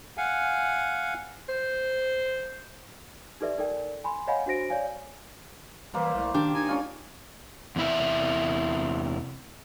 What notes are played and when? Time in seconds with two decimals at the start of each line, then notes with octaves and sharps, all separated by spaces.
0.17 F5 F#5 G#5
1.49 C5
3.41 D#4 G4 A4 B4 D5 E5
3.58 D#4 A4 A#4 D5 G5
4.04 G#5 B5 C6
4.27 C#5 D#5 F5 F#5 G#5 B5
4.46 D4 F#4 C5 A#6 D7
4.70 C#5 D5 F5 G#5
5.94 E3 G3 A#3 C5
6.14 C2 A3
6.34 D#3 D4 G4
6.54 D#4 G#5
6.67 C#4 F4 D5
7.76 E2 C3 E4 E5